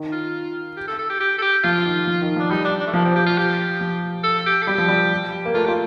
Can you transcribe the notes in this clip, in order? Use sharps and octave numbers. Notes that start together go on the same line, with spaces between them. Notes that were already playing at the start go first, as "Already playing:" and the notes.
Already playing: D#3
F4
G4
A4
A4
G4
G4
A4
G4
F3 F4
D#3
F3
D#3
F3 D4
G3 D#4
D4
D4
A3
F3 A#3
C4
G4
F4
G4
F3
A4
G4
A4
G3 G4
F3
G3
A#3
A3 F4
G4
F4